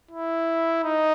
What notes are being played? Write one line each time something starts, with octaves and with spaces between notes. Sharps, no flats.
E4
D#4